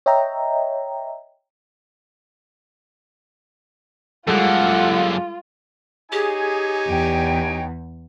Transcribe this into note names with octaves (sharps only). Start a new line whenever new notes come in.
C#5 D#5 E5 G5 A#5
F#2 G3 G#3 A#3 F4 A4 F#5
D#4 G4 G#4 C#5 G#5
E2 G5